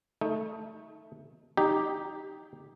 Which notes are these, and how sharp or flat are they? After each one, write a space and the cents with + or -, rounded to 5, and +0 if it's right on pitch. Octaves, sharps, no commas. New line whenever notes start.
A3 +0 D#4 +25
D#4 +0 G4 +0